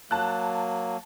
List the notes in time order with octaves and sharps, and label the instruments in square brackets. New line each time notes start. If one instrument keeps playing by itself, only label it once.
[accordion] F#3 A#3 [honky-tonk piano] A5 F#6